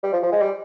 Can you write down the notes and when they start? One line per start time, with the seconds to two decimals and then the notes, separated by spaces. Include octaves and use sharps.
0.03 G3
0.13 F3
0.23 F3
0.32 G#3
0.41 G3